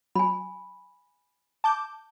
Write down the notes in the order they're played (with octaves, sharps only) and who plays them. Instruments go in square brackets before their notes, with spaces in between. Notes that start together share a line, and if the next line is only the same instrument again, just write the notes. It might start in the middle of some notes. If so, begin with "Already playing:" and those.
[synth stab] F#3 [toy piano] G#5 B5
[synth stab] A5 D6 G6